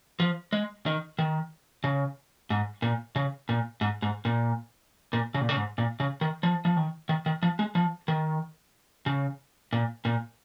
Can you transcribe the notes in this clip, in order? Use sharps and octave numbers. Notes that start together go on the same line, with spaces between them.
F3
G#3
D#3
D#3
C#3
G#2
A#2
C#3
A#2
G#2
G#2
A#2
A#2
C#3
A#2
C#3
G#2
A#2
C#3
D#3
F3
F3
D#3
D#3
D#3
F3
G#3
F3
D#3
C#3
A#2
A#2